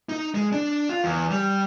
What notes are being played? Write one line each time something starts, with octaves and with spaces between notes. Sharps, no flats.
D#4
G#3
D4
F4
E2
G3